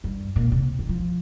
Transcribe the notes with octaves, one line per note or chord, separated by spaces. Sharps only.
G2
A#2
C3
D#3
F3